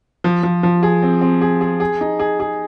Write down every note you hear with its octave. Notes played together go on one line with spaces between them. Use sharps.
F3
F3
F3
G#4
C4
C4
G#4
G#4
G#4
D#4
G#4
G#4